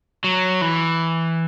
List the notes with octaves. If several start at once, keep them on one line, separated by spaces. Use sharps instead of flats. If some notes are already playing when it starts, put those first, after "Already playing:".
F#3
E3